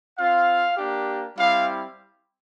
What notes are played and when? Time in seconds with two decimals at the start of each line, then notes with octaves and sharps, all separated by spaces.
0.18 C4 F4 F5
0.77 A#3 D4 G4
1.37 G3 C4 E4 G4 F5